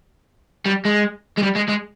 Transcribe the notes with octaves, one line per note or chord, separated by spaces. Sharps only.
G3
G#3
G#3
G3
G#3
G#3